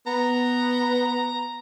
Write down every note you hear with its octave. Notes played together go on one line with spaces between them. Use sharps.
B3 A#5